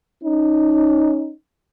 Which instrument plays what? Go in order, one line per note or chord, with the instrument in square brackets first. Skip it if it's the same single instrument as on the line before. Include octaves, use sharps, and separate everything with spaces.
[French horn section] C#4 D#4